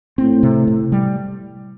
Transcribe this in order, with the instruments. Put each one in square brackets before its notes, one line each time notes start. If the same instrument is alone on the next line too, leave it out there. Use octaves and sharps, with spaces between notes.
[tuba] A2 [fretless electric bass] C4
[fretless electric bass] C3
C3
G3